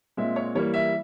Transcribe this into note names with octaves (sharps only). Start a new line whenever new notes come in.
A#2 G#3 C4 E5
C#5
E3 G3 A#3 C#5
E5